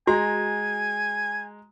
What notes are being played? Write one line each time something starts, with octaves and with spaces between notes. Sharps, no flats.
G#3 F#4 G#5 A#5